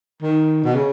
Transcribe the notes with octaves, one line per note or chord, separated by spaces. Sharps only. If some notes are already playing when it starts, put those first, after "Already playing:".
D#3
B2
C#3